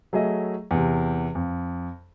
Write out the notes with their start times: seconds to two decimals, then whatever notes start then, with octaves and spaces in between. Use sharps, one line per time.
0.13 F#3 A3 G#4 D#5 E5
0.71 E2 C3
1.35 F2